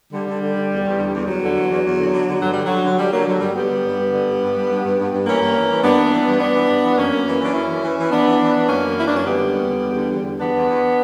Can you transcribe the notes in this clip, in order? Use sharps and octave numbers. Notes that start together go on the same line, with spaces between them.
D3 G3
D3
D3
D3
E2
E2
D3
E2
E2 F#3
D3
E2
E2
E2
D3
D3
D3
G2 F#3
D3 G3
D3 F#3
D3
D3 G3
D3 F#3 A#3
D3 F#3
G2 G3
D3 G3 B3
D3
G2
G2
D3
G2
G2
G2
G2
G2
G2
G2
E3 A#3 C#4
G2
E3
E3
G2 B3 D4
E3
E3
G2
G2 B3 D4
E3
G2
E3
F#2 A#3 C#4
F#2
E3
E3 D4
F#2 C#4 E4
E3
E3
E3
E3 B3 D4
E3
E3
E3
F#2 A#3 C#4
F#2
E3 E4
D4
F#2 C#4
D3 G3 B3
D3
E2
D3
E2
D3
E2
D3
E2 B3 D4
E2
E2